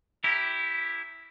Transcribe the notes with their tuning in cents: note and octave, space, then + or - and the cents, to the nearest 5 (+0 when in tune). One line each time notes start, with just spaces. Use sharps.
E4 +0 G4 -10 A#4 -15